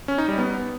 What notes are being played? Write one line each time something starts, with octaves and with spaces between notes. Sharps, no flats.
C#4
D#4
G3
B3